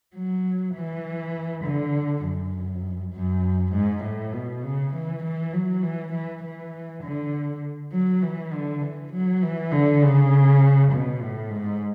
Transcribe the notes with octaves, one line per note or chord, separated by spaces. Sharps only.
F#3
E3
D3
F#2
F#2
G#2
A2
B2
C#3
E3
E3
F#3
E3
E3
E3
D3
F#3
E3
D3
E3
F#3
E3
D3
C#3
B2
A2
G#2